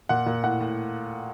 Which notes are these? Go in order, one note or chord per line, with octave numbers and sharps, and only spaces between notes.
A#2 F#5
A#2
A2 F#5
A2